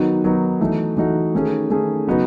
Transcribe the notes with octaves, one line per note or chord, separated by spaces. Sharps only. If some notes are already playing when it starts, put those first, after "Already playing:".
Already playing: D#3 F#3 B3 D#4 F#4
D#3 F#3 B3 D#4 F#4
E3 A3 D#4 F#4
E3 A3 D#4 F#4
D#3 A3 C#4 G#4
D#3 A3 C#4 G#4
C#3 F#3 B3 D#4 F#4